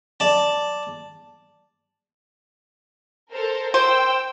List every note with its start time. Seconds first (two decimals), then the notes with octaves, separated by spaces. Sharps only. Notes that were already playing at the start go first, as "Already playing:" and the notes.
0.20 D5 A5
3.33 A4 A#4 C5
3.74 C5 G5 E6